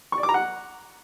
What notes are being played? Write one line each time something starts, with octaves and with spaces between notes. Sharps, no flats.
C#6
D5
D6
A#5
F#5